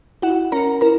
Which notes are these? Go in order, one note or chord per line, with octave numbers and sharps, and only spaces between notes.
E4 F#4 F#5
C#4 A#4 A#5
E4 A#4 A#5